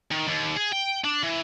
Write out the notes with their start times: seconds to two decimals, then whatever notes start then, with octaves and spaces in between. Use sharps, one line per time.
0.11 D#3
0.28 D#2
0.57 G#4
0.73 G5
1.04 D4
1.23 E3